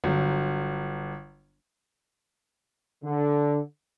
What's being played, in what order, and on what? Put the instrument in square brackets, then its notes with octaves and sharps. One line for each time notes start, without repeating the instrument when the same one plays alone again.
[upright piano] G1 F#3
[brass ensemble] D3